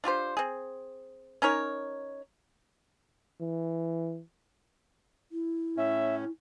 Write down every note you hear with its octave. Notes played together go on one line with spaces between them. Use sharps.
D4 F4 G4 C5
C4 G#4
C#4 D#4 A#4 C#5
E3
E4
A2 C#4 E5